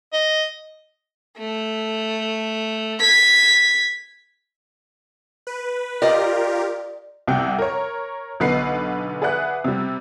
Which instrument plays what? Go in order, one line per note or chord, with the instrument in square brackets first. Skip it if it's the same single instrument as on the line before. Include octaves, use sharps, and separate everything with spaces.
[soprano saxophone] D#5
[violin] A3
G#6 B6
[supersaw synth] B4
[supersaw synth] F4 G4 A#4 [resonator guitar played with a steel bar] D5 D#5
[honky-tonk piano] C2 C3 F#5 G5
A#4 C#5
B1 D3 B3 B4 F#5 C7
G#4 B4 D5 E5 F#5 F#6
C3 G3